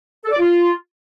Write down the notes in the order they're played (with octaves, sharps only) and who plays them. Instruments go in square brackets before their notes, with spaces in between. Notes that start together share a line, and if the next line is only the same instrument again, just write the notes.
[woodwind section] A4
D5
F4